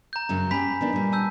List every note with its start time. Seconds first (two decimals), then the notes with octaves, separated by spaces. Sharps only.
0.13 A#5 G6
0.29 F#2 C#3 F#3
0.51 C#4 G4 G#5 B5 B6
0.81 D#3 B3 D4
0.93 A#2 G3
1.12 A5 E6 G6